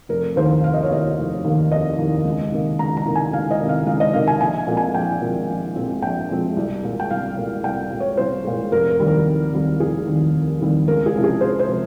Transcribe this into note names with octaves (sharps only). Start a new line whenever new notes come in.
F1 A#4
D#2 D#3 A#3 C5
F1 F5
D#5
C#5
D#2 D#3 A#3 D#5
F1
D#2 D#3 A#3
F1 D#5
D#2 D#3 A#3
C#2
C3 D#3 A#3
C#2 A#5
A#5
C3 D#3 A#3
G#5
C#2 F5
D#5
C3 D#3 A#3
F5
C#2 F5
D#5
C3 D#3 A#3 F5
G#5
A#1 G#5
A#2 F3 G#3 C4
G#5
A#1 G5
A#2 F3 G#3 C4
A#1
A#2 F3 G#3 C4
A#1 G5
A#2 F3 G#3 C4
C2
A#2 G#3
G5
C2 F5
A#2 G#3
C2 G5
A#2 G#3
C#5
C2 C5
A#2 G#3
F1 A#4
A#4
D#2 D#3 G3 C4
A#4
F1
D#2 D#3 G3 C4
F1 G#4
D#2 D#3 G3 C4
F1
D#2 D#3 G3 C4
C#2 A#4
G#4
C3 F3 G#3 C#4
G#4
C#2 C5
C5
C3 F3 G#3